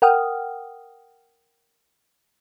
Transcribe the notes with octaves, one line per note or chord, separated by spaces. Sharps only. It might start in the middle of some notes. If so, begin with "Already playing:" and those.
A#4 F#5 G5 D#6 F6